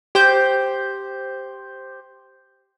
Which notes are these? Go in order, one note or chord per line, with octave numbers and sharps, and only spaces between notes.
G4 C5 G6